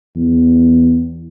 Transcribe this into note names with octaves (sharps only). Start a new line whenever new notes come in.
E2